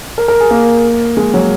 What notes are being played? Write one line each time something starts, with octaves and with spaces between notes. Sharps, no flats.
A#4
A#4
G#4
A#3
G#3
F#3